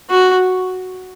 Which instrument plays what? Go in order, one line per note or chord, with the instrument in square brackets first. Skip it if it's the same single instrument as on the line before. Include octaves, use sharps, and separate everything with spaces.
[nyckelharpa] F#4